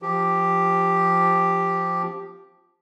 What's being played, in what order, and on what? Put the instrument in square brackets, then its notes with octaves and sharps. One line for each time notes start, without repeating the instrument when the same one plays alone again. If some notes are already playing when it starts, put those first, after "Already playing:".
[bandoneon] F3 G4